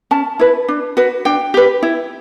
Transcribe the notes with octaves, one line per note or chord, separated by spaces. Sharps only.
C#4 A5
E4 B4
D4
F#4 B4
D4 G5
G4 B4
E4